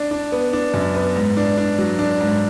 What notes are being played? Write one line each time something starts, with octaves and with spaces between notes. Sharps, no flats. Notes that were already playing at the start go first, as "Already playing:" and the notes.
Already playing: D4
D4
B3
D4
F#2
B3
G#2
D4
D4
F#3
D4
G#2